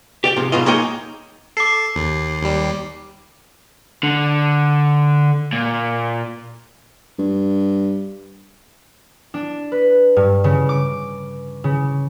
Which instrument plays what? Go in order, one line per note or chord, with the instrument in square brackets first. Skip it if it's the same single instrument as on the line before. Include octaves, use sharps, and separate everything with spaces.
[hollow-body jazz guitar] G4 D5 G5
G#2 C3 F3
G#2 B2 F#3 F4 D#5
G#3 A#3 D#4 C#5 D#5 G5
[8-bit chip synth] A4 [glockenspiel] D6 C7
[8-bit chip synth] D#2
D#2 G3
[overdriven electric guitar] D3
A#2
[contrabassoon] G2
[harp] D4
B4
G2
C#3
D6
C#3